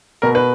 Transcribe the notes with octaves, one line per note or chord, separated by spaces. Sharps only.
B2 A#4
B4